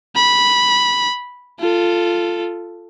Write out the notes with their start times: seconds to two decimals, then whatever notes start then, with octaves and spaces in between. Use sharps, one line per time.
0.15 B5
1.59 F4 A4